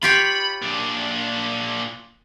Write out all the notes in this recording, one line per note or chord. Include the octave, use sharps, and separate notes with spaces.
F4 G4 C#5 B5
A#2 D4